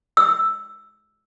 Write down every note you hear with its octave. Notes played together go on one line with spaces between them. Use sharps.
E6